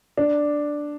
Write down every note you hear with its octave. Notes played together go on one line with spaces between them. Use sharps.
D4